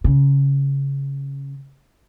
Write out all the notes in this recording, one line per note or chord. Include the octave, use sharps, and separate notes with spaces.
C#3